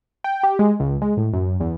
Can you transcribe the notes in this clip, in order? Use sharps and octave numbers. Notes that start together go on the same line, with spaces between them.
G5
G4
G#3
C#2
G#3
A2
F#2
E2